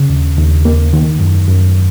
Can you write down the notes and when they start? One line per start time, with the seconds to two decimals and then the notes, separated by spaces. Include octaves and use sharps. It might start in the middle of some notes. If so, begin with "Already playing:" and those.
Already playing: C#3
0.10 D#2
0.38 D#2
0.65 A#3
0.93 D#3
1.20 F#2
1.48 F#2